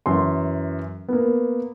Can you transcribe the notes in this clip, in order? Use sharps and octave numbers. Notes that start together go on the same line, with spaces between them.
F#2 E3 C6
A#3 B3